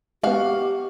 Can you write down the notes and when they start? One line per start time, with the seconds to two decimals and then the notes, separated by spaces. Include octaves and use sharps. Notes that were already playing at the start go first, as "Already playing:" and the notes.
0.23 G#3 B3 F#4 G4 F5